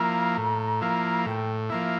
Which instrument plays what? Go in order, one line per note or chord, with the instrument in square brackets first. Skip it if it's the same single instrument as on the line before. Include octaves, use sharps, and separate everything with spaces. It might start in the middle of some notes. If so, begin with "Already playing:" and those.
Already playing: [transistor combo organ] F3 A#3 E4 [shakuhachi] A#5
[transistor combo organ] A2
F3 A#3 E4
[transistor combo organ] A2 [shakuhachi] G5
[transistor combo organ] F3 A#3 E4 [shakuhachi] E5